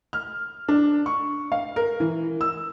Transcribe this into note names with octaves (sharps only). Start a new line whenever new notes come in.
F6
D4
C#6
F5
A#4
E3
E6